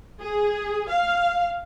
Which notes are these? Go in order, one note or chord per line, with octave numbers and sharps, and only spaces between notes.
G#4
F5